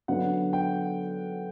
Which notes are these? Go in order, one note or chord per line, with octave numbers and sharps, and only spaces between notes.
D3 F#3 B3 D4 F#5
G5